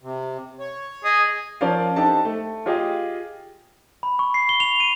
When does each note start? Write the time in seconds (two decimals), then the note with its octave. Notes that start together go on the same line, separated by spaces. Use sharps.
0.03 C3
0.59 C#5
1.04 G#4 D#5 D#6
1.61 F3 C#4 A#4 C5 D5 F5
1.96 D4 D#4 G4 A4 C5 A5
2.25 A3
2.66 F4 G4 G#4 D#5 F5
4.03 B5
4.19 C#6
4.34 C7
4.49 G7
4.60 F7
4.80 D#7